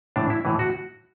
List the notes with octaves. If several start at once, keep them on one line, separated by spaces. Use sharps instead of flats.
A2 E3 D4
E4
A2 E3
F#4